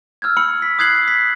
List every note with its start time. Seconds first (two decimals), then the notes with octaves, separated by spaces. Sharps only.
0.22 E6 F6 G6 G#6
0.37 B5 E6 C#7 F#7
0.62 B6
0.79 D#6 F#6 G#6 C7 F#7
1.08 B6